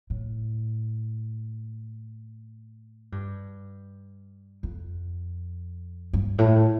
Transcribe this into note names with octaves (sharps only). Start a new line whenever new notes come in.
A2
G2
F2
G2
A2